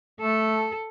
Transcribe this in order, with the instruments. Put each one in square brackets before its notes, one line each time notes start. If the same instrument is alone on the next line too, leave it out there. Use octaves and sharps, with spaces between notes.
[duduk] A3 [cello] A4